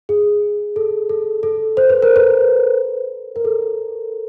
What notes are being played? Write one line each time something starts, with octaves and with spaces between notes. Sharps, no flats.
G#4
A4
A4
A4
C5
B4
A#4
B4
A#4
A4